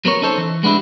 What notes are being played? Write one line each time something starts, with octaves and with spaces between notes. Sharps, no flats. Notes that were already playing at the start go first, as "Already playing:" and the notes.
F#3 B3 A#4 C#5
C#4 D#4 A4 C5 C#5
E3
G#3 B3 D4 E4 G4